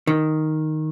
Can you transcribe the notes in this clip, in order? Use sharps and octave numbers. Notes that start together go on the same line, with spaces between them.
D#3